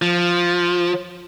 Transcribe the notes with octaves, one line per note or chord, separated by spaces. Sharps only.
F3